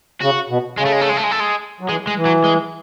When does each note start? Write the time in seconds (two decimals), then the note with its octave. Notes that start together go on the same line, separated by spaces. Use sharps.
0.22 C#3 F#4
0.50 B2
0.77 C#3 G#3
0.85 A3
0.93 G#3
1.01 A3
1.09 G#3
1.17 A3
1.24 G#3
1.31 A3
1.40 G#3
1.81 F#3
1.89 E3 G#3
2.07 G#3
2.16 E3
2.26 F#3
2.44 G#3